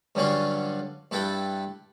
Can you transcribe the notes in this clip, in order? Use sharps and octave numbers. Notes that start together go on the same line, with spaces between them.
G2 D3 F#3 C#4 F4 F#4
G2 E4 A4 B4 G5